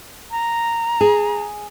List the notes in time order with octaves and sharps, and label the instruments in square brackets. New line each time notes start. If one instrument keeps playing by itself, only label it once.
[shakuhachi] A#5
[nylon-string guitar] G#4